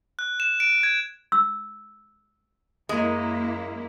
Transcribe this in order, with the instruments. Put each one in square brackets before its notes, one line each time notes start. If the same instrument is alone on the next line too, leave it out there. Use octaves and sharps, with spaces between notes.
[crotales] F#6
E7
D7
G#6
[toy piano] E6
[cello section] F#2 A#3 E4 [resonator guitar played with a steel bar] G#3